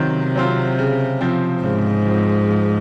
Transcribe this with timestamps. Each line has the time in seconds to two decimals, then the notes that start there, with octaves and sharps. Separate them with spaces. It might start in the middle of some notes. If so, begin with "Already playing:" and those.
Already playing: C3 D#3 F#3 C4 F4
0.36 F#3 C4 F4
0.79 C#3
1.21 F3 C4
1.63 G#2 C#3
2.06 F3 C4
2.49 F3